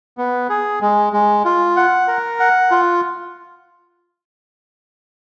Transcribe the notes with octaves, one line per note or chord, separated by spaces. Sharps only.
B3
G#4
G#3
G#3
F4
F#5
A#4
F#5
F4